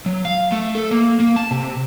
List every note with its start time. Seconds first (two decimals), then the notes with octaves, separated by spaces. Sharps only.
0.06 F#3
0.25 F5
0.52 A3
0.75 A4
0.91 A#3
1.20 A#3
1.36 A5
1.51 C3